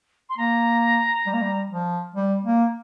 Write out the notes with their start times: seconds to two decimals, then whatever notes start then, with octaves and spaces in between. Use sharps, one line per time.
0.29 C6
0.37 A#3 A#5
1.26 G3
1.34 A#3
1.42 G3
1.70 F3
2.15 G3
2.44 A#3